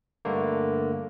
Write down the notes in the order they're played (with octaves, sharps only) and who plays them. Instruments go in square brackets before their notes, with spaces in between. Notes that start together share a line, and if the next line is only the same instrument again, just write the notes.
[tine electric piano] G2 D3 A3 A#3